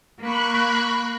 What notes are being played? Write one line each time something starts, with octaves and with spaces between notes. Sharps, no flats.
A#3 B5 C#6 F#6